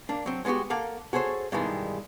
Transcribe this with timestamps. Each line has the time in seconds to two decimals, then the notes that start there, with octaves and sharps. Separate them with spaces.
0.09 A#3 D4
0.26 F#3 C4
0.45 G#3 B3 D#4 F#4 G4
0.70 A#3 A4 F5 F#5
1.13 F#4 G#4 A4 C5 C#5
1.52 G2 B2 D#3 E3 G3 G#3